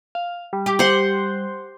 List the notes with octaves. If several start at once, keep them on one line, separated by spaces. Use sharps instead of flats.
F5
G3
G4
C5 F#5